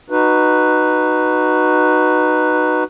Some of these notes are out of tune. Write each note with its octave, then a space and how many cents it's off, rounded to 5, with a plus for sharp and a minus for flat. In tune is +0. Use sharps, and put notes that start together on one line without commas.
D#4 -20 F#4 +0 B4 +0